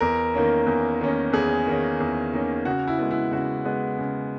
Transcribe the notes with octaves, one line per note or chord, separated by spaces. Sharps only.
E2 A#4
D#3 A#3 C#4
E2
D#3 A#3 C#4
E2 G#4
D#3 A#3 C#4
E2
D#3 A#3 C#4
C#3 F#4
E4
G#3 B3
E4
C#3 F#4
G#3 B3
C#3